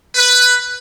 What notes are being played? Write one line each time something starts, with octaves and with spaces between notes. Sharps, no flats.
B4